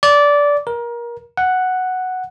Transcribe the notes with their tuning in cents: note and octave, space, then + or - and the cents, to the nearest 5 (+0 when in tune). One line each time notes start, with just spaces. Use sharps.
D5 -15
A#4 +25
F#5 +0